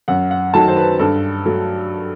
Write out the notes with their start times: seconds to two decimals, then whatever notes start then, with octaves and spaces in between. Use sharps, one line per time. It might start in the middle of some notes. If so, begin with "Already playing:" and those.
0.08 F#2 F#5
0.31 F#5
0.54 D#3 F#3 A3 A5
0.68 C5
0.77 B4
0.99 G2 A4
1.46 F#3 A3